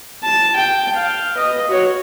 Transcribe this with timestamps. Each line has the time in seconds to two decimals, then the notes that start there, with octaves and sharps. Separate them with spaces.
0.23 A5
0.56 G5
0.96 F5
1.35 B4 D#5
1.68 F#4 C#5